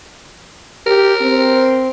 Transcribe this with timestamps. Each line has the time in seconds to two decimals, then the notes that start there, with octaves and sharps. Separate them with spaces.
0.86 G4 A#4
1.21 C4